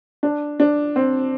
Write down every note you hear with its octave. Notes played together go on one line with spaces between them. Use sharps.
D4
D4
C4